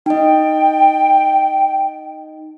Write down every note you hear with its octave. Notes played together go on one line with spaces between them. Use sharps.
D#4 D#5 G5